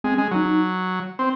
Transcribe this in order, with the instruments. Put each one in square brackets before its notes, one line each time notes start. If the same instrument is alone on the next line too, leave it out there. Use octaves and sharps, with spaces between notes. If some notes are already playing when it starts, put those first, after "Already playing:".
[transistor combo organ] G#3 [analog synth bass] C4
[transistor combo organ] G#3 [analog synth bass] C#4
[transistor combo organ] F#3 [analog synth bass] D#4
[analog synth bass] D#4
[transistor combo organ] C4